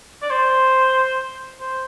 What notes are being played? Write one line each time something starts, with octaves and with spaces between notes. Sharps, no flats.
D5
C5
C5